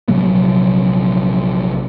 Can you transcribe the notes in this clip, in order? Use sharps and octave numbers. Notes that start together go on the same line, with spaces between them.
A#1 C3 F#3 A#3